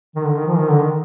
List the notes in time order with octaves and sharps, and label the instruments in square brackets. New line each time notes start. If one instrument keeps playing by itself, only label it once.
[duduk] D#3
D3
D#3
F3
D#3
D3
D#3